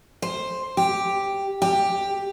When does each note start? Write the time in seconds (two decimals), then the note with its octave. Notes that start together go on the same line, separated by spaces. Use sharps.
0.22 C5
0.77 G4
1.62 G4